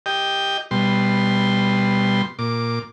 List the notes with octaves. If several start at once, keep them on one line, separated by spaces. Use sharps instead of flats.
G4 D#5 G5
B2 G3 C6
A#2 D6